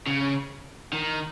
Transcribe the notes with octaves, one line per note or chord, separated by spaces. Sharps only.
C#3
D#3